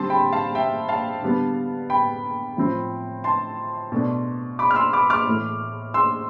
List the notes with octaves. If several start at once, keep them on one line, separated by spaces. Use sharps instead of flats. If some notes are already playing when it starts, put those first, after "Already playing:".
Already playing: D3 G3 C4 A5 C6
G5 B5
F5 A5
E5 G5
F5 A5
D3 G3 B3
G5 B5
A2 F3 C4
A5 C6
B2 A3 D4
B5 D6
F6
C6 E6
B5 D6
D6 F6
A2 E3 A3
C6 E6